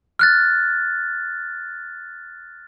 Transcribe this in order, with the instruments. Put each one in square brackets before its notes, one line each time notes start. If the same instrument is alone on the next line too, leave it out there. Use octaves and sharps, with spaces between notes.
[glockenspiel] F6 F#6 A6